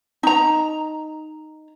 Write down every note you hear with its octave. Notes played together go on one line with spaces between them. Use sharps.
D#4 A#5